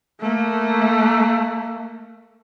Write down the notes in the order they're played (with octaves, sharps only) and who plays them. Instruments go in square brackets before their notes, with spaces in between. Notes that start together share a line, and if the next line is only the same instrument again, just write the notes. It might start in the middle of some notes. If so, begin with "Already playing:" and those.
[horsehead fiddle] A3 A#3